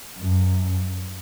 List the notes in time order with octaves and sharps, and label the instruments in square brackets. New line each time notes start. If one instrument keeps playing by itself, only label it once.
[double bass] F#2